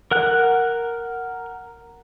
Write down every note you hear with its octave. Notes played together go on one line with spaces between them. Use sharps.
A#4 F#5 F#6